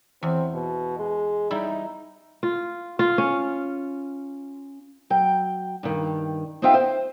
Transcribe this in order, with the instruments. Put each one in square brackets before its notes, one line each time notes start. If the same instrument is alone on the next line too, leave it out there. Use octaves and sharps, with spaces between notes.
[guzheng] E2 [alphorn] C4
[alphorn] B2
G#3
[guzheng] G3 E4 [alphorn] D#4
[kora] F4
F4
C#4
[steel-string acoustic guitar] F#3 G5
G2 D#3
B3 C4 D#4 F4 E5 G5
C5